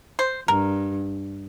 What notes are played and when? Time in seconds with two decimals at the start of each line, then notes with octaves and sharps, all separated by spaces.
0.19 C5
0.48 G2 A#4